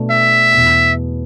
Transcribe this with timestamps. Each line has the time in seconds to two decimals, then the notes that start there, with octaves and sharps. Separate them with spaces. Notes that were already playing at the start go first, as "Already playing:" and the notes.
Already playing: B2 A3 D4
0.11 E5
0.52 E2 B2 B3